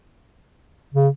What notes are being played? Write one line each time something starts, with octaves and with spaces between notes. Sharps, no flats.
C#3